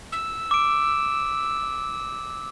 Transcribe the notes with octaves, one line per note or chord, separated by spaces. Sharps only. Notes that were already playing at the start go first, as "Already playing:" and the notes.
E6
D6 D7